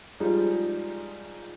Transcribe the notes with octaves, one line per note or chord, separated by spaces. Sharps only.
F3 G3 G#3 D#4 F4 G#4